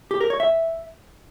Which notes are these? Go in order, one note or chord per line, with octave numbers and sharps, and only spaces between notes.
G4
A#4
C#5
E5